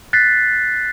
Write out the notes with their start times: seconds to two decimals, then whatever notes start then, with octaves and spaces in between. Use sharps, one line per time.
0.13 F#6 A6 B6 C7